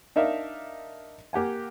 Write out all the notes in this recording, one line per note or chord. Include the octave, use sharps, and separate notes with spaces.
D4 D#4 A#4 E5 F5
A#3 G4 F#5 G#5